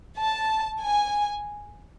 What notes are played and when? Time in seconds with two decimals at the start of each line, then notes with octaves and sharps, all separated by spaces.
0.18 A5
0.81 G#5